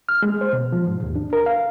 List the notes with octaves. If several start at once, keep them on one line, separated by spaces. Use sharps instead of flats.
F6
G#3
C5
B2
F3
G#2
D#2
D4
A#4
F5